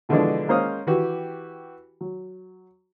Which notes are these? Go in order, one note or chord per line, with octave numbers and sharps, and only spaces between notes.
B2 D3 E3 F3 G#3 D4
G#3 A#3 C#4 C5 F5 D#6
E3 F#4 G4
F#3